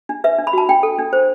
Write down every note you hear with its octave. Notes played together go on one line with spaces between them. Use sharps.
D4
B4 E5
D4
B5
F#4 A5
D4 G5
A4
D4
C5